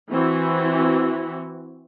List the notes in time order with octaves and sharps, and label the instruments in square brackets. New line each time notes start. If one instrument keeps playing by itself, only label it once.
[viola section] E3 C4 E4 F#4